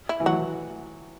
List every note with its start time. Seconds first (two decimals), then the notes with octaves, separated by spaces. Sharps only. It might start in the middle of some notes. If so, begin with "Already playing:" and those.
0.09 E4
0.20 E3
0.26 F#3 F#4